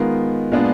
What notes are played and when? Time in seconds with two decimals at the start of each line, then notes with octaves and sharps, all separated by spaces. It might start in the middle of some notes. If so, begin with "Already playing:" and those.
Already playing: D#3 G#3 B3 F4 A#4
0.52 A#2 G#3 B3 D4 F4